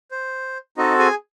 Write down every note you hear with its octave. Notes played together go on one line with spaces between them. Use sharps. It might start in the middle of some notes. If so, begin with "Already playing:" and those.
C5
C4 D#4 F#4 A4 D#5
G#4 G#5